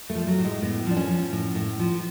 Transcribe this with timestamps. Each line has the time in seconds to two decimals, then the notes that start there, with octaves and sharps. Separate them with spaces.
0.10 A3
0.15 F3
0.27 F#3
0.38 A2
0.45 G#3
0.62 A2 B3
0.86 F3 D4
0.97 C#4
1.09 F3
1.32 A2
1.55 A2
1.79 F3